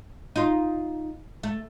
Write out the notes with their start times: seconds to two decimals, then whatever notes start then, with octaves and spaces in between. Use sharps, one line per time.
0.36 D#4 F4
1.43 A3